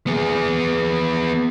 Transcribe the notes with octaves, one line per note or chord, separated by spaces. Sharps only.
B3 G#4